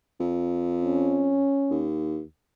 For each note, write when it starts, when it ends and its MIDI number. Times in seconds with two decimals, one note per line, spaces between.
0.20 1.44 41
0.83 1.87 61
1.71 2.21 39